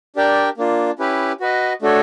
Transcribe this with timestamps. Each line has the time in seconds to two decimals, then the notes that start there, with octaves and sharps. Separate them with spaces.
0.16 D4 G4 A#4 D5 G5
0.57 A#3 D4 F4
0.99 C#4 E4 G4 B4
1.40 F#4 B4 D#5
1.82 A3 D4 F#4 A4 C#5